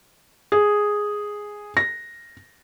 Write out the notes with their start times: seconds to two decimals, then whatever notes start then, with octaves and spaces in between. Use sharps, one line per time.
0.52 G#4
1.77 A#6